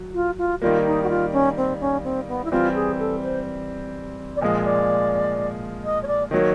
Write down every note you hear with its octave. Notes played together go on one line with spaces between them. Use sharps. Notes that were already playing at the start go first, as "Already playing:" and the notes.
Already playing: F#3
F4
F4
D#3 G3 A#3 F4
D#4
F#4
F4
C#4
C4
C#4
C4
B3
E4
E3 G3 C4 F4
G#4
A4
C5
D5
A#2 F3 G#3 D#5
D#5
D5
D#5
C#5
D5
D#3 F#3 A#3 C#5